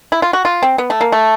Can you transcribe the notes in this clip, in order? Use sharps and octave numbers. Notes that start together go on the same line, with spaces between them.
E4
F4
F#4
F4
C4
B3
A3
A#3
A3